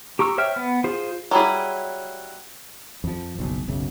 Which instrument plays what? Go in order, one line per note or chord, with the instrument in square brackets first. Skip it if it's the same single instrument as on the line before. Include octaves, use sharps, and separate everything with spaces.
[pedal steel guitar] G4 A#5 C#6 E6
C5 C#5 E5 G5 F6
B3
F4 G#4 C5
[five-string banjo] F#3 G3 B3 E4 G#4
[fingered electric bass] F2 F3
F#1 B1
F#1 B1 F#2 C#3